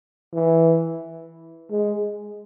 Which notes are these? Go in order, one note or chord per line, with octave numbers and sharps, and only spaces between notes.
E3
G#3